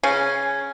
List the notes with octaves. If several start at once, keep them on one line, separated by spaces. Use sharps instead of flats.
C#3 C#4